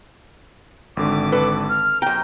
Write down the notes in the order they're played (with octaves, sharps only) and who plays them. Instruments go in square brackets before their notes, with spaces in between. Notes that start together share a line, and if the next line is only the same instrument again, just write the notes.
[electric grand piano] G#1 D3 [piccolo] D6
[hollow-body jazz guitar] A4 B4
[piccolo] F6
[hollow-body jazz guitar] F#2 G5 [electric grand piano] A#5 [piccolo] G6